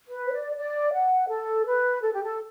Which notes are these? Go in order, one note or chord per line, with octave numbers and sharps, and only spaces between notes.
B4
C5
D5
D5
F#5
A4
B4
A4
G4
A4